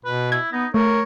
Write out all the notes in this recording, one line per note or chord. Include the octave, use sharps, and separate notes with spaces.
B2 B4
E4 G#6
B3 D#4
A3 A#4 C#5